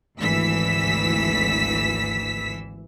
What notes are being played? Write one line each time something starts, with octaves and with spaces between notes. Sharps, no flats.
G#1 D2 E3 E6 B6